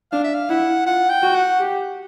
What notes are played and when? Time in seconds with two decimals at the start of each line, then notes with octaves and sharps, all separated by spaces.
0.12 D4 F5
0.24 E5
0.35 F5
0.49 E4 F#5
0.86 F4 F#5
1.10 G5
1.23 F#4
1.35 F#5
1.60 G4